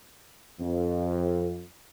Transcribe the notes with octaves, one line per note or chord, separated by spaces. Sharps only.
F2